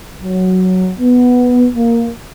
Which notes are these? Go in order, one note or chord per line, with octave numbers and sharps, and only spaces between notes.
F#3
B3
A#3